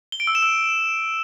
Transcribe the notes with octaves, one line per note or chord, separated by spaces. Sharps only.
G7
D7
E6
E7
E6